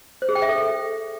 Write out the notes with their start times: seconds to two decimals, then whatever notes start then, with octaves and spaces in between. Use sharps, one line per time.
0.22 C5
0.29 G#4
0.35 G5
0.42 E5
0.49 A4